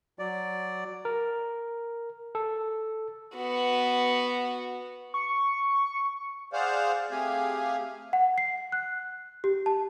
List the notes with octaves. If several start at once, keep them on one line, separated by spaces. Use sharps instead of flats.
F#3 D5
A#4
A4
B3 F#4
C#6
G#4 C5 D5 F5 F#5
A3 C4 G4 G#4 F5 G#5
F#5
C7
F#6
G4
A5